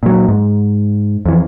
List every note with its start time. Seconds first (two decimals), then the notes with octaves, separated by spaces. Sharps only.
0.03 A#2 F#3
0.28 G#2
1.26 F2 E3